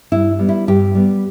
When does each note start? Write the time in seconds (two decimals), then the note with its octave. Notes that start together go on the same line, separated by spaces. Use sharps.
0.11 G2 E4
0.39 G3 B3
0.49 E4
0.68 G2 G4
0.95 G3 B3